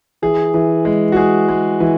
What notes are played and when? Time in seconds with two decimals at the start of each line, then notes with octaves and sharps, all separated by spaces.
0.22 E3 G#4
0.54 E3
0.85 G#3
1.12 F#4
1.16 G#3 G#4
1.48 G#3
1.80 E3